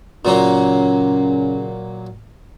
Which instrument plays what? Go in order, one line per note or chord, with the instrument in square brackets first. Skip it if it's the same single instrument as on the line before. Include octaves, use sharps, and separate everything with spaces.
[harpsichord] A#2 F#3 A#3 [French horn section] C#3 C#4